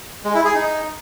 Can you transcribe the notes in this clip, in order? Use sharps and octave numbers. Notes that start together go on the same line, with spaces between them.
G#3
E4
G#4
D#4